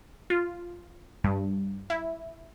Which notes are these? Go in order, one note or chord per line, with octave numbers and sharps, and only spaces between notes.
F4
G2
E4